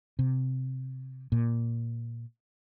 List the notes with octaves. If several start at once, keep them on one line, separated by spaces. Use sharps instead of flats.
C3
A#2